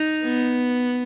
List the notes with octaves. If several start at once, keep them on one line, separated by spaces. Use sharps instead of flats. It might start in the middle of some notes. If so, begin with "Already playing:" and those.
Already playing: D#4
B3